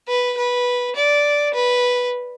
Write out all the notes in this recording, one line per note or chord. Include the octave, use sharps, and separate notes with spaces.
B4
B4
D5
B4